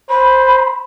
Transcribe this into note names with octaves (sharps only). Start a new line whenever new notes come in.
C5 B5